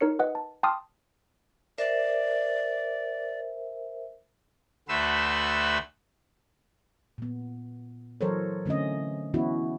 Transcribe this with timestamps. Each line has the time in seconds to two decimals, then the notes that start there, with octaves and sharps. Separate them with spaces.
0.01 D#4 A#4 C#5 C#7
0.19 B4 D#5 F#5
0.35 A5
0.63 G5 A5 C6 D6 D#6 F6
1.78 A#4 C5 D5 E5
4.89 D2 A3 F#4 B4 C5 E6
7.18 A#2 B3
8.21 E3 F#3 A4 A#4 C5 C#5
8.66 D3 A3 C4 C#4 D#5
9.34 E3 B3 C#4 E4 F#4